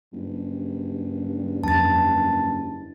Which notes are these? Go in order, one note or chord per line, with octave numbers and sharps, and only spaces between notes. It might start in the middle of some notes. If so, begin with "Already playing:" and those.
F#1 G2
F2 A5 A6